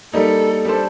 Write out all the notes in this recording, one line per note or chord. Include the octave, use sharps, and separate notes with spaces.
G3 A#3 D#4 A4
G3 D4 A4 C5